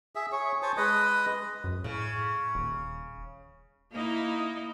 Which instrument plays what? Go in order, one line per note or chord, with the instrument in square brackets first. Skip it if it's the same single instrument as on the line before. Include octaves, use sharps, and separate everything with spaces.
[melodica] G#4 E5
G#4 C#5
C5 C#5 G#5 A5
G#3 B4 D#5 D#6
[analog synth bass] F#2
[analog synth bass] A2 [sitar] C#3
[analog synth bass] D#1
[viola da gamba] A#3 D#4 E4